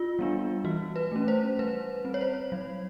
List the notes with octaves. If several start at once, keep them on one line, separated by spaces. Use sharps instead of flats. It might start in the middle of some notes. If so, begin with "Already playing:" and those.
Already playing: F4
G3 B3 D4
E3 F#4
B4
A3 C#4
C5
G3 B4
C4
C#5
C5
F#3